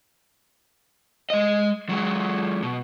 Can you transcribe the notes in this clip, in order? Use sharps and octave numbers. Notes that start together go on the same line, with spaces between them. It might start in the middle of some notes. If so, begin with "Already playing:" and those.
G#3 D#5
F#3 G#3
B2